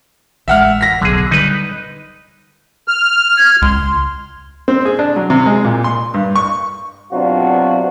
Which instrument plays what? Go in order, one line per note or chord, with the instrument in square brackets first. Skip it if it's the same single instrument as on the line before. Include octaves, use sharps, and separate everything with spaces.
[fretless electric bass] A1 G#3 [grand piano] E5 F#5 F6
[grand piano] A#6 B6
[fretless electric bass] D1 B1 F#3 [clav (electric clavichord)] D3 G#4
[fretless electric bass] D3 G3 [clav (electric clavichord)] D#4 B4
[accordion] F6
[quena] G#6
[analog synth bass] C#2 [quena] C6
[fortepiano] C4
G#4
D4
F#3
C3
G#3
A#2
C6
G2
C#6
[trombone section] B1 C3 F#3 D4 F4 F#4